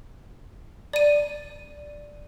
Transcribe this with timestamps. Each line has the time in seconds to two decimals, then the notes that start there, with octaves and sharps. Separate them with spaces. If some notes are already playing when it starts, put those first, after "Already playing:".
0.93 D5 D#7